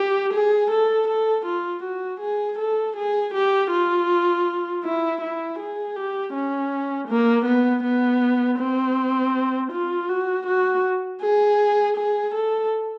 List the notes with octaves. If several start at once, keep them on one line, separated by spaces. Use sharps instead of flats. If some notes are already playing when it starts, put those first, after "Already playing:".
Already playing: G4
G#4
A4
A4
F4
F#4
G#4
A4
G#4
G4
F4
E4
E4
G#4
G4
C#4
A#3
B3
B3
C4
F4
F#4
F#4
G#4
G#4
A4